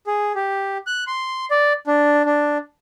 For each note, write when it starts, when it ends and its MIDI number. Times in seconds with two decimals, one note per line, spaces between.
0.07 0.33 68
0.35 0.77 67
0.87 1.04 90
1.07 1.45 84
1.51 1.73 74
1.87 2.23 62
2.25 2.58 62